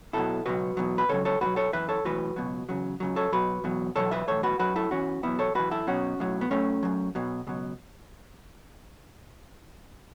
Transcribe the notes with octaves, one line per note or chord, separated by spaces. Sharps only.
B1 B2 F#3 E4 A4
C#2 B2 F#3 F#4 B4
E2 B2 F#3
B4
C#2 C#3 F#3 A4 C#5
A4 C#5
B1 A2 F#3 F#4 B4
A4 C#5
F#2 E3 B4 E5
A4 C#5
B1 A2 E3 F#4 B4
C#2 B2 F#3
E2 C#3 F#3
C#2 C#3 F#3
A4 C#5
B1 B2 F#3 F#4 B4
E2 B2 F#3
E2 B2 F#3 A4 C#5
B4 E5
B1 A2 E3 A4 C#5
F#4 B4
F#2 F#3 F#4 B4
E4 A4
E2 E3 C#4 F#4
E2 B2 F#3 B3 E4
A4 C#5
F#2 E3 F#4 B4
E4 A4
B1 B2 F#3 C#4 F#4
B1 A2 F#3
B3
F#2 F#3 A3 C#4
F#2 F#3
B1 B2 F#3
C#2 B2 F#3